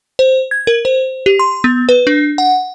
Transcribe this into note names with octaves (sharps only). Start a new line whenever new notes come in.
C5
G#6
A#4
C5
G4
C6
B3
B4
D4
F#5